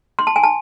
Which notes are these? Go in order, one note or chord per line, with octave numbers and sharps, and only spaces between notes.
C6
A5
G#5
A5